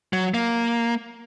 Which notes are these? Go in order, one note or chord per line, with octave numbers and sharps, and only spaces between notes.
F#3
A#3